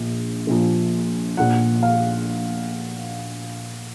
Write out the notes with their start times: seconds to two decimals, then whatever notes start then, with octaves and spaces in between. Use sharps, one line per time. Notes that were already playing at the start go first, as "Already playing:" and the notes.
Already playing: A#1 A#2 F3
0.47 A#1 A#2 F3
1.37 A#1 A#2 F3 F#5
1.83 F5